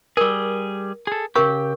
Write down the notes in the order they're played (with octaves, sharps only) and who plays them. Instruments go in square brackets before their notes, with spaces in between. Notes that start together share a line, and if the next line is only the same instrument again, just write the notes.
[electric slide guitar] G3 G#4 [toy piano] A#4
[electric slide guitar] G#4 A4
[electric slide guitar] C#3 G4 [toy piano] A#4 C#6